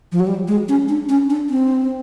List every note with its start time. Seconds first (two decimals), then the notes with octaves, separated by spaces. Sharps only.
0.12 F3
0.20 F#3
0.27 G3
0.48 G#3
0.69 C#4
0.89 D4
1.09 C#4
1.30 D4
1.50 C4